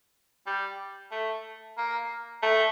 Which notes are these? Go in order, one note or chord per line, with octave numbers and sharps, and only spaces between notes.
G3
A3
A#3
A3